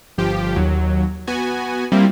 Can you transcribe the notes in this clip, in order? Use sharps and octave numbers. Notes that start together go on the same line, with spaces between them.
G1 F3 G4
D#2 F#3
B3 F#4 G#5
G3 A#3 C4 E4 F4